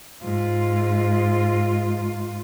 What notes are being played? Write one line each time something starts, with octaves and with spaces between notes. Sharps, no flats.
G#2 F4